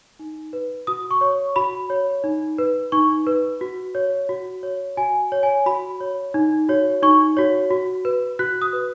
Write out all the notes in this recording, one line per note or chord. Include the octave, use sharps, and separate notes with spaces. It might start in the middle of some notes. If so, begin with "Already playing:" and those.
D#4
B4
F#4 D#6
C#6
C#5
F#4 B5
C#5
D#4
B4
D#4 C#6
B4
F#4
C#5
F#4
C#5
F#4 G#5
C#5
G#5
F#4 B5
C#5
D#4
F#4 C#5
D#4 C#6
F#4 C#5
F#4
B4
F#4 F#6
D#6
B4